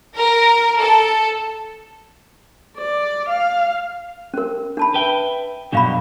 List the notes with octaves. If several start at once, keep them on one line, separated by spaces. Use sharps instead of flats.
A#4
A4
D5
F5
C#4 A#4
D4 A5 B5
B4 E5 G5
G2 B2 F#3 D4 F5 B5